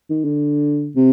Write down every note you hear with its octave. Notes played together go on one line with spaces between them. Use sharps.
D#3
D3
C3